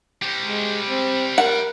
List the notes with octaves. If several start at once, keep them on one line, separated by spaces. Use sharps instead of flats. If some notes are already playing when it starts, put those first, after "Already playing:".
G3 C5
G#3
C4
A#4 F#5